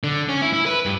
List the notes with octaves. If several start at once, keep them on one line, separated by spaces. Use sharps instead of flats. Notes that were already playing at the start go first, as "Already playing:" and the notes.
D3
C#4
E4
E4
B4
G2